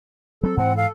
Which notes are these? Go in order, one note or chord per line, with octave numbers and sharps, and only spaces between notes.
F#3 C4 A4
G#2 E3 C4 F#5
A4 F5